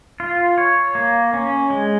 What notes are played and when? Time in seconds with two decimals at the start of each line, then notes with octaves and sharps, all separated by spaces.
0.20 F4
0.58 C#5
0.95 A#3
1.33 C#4
1.70 G#3